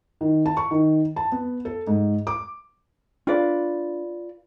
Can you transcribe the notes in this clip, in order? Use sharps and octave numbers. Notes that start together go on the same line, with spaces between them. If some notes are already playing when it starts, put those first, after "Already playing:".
D#3
A5
C#6
D#3
A5
B3
A4
G#2
D6
D4 F4 B4 D5